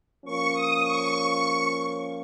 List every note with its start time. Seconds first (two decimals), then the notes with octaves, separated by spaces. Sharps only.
0.25 F3 A#3 C#4 C#6
0.54 D#6
0.82 C#6